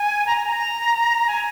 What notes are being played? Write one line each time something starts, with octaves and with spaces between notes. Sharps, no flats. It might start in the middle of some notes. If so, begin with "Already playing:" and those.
Already playing: G#5
A#5
G#5
A#5
G#5